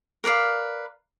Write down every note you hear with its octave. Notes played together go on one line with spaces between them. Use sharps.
A#4 B4 D5 F5